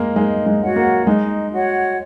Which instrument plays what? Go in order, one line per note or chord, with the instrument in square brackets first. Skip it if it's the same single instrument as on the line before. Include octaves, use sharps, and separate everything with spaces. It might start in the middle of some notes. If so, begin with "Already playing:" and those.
Already playing: [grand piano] G#3 A#3
[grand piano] G#3 [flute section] D#4
[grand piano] G#3
[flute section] F#4 C#5 F#5
[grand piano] A#3
[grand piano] G#3 [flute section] D#4
[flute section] F#4 C#5 F#5